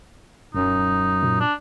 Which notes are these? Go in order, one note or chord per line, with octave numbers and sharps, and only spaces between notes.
D#1 F#2 D#4
A#2
D4